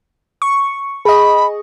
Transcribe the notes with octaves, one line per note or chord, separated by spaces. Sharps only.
C#6
G#4 D#5 B5